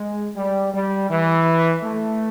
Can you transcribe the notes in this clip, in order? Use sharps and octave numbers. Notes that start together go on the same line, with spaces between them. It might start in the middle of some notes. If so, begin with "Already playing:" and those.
Already playing: G#3
G3
G3
E3
A3